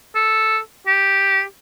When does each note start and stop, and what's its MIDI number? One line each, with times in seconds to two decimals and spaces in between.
0.15 0.59 69
0.87 1.43 67